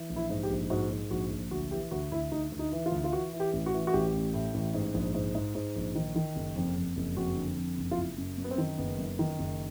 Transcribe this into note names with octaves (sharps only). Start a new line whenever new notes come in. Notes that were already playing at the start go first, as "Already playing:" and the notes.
Already playing: E3
A#1
E4
G#2
G4
A#1
G#2 F#4
G#2
A#1 F#4
A#1
D2 F#4
E3 G4
D2 F#4
D2 E4
D2 D#4
D2
D#4
E3
F4
D2
F4
E3 F#4
E3
G4
A1
F#4
E3
F#4
A1 G4
A1
A2
A1
G#2
A#1
G#2
G#2
G#2
A#1
D#3
D#3
F#1
F2
F2
F#1
F2 F#4
D3
F2
F#1
F4
F#1 E4
F#2
F#2
B3
C4
D#3
F#1 B3
F#2
D#3
F#1